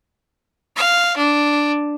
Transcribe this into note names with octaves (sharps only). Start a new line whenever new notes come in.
F5
D4